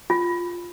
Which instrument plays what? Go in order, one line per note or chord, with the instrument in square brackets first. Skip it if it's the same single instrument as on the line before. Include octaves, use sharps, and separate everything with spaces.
[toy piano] F4